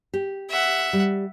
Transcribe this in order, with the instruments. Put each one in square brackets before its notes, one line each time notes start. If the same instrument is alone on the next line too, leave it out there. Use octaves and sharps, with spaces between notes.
[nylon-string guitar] G4
[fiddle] E5 F#5
[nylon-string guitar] G3